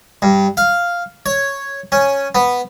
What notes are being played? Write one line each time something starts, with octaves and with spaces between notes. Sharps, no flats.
G2
F5
C#5
C#4
B3